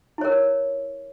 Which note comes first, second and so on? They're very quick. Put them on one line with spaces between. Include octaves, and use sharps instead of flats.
E4 C#5 A#4